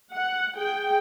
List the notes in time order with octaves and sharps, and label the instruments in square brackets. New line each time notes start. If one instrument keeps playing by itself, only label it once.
[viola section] F#5
G#4 G5